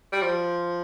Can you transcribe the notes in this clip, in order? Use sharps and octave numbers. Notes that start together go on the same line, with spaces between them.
G3
F3